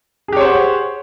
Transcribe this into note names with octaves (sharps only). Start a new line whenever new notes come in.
G4 G#4 C5 C#5 F#5